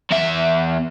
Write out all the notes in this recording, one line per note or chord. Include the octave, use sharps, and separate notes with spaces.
E2 E5